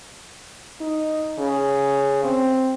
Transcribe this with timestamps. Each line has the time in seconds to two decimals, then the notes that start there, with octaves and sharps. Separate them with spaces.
0.81 D#4
1.39 C#3
2.24 C4